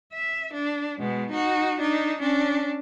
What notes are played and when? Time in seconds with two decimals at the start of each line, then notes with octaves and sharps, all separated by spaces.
0.13 E5
0.53 D4
0.99 B2 G#3
1.30 D#4 F#4
1.79 D4 D#4
2.19 C#4 D4